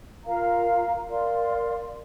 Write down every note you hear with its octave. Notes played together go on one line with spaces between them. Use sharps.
F4 A#4 F5 A#5
A#4 D5 F5 C6